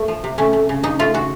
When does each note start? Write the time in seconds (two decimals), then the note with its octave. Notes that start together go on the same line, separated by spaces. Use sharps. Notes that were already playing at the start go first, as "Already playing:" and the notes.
Already playing: A3
0.08 F3
0.24 C3
0.38 A3 C#4
0.53 A3
0.69 C#3
0.83 C#3 D#4
0.99 A3 F4
1.14 C#3 F#4